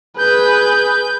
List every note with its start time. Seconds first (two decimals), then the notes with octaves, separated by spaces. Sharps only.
0.18 G#4 B4 G6